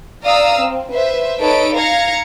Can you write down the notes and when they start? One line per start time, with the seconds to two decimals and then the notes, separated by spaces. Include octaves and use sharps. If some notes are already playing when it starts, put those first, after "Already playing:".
0.23 D5 F5 A#5 D#6 E6
0.60 C4
0.91 B4 C5 E5
1.38 D#4 A4 B4 C#5 D#5 D7
1.75 F5 A#5 G#6 A#6 C#7